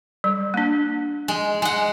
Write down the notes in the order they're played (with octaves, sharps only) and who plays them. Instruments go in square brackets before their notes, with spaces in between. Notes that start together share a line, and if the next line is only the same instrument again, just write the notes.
[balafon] G3
A#3 D4
[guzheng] G#3
G#3 F#5